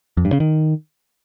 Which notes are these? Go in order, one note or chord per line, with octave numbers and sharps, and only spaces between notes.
F2
G2
C#3
D#3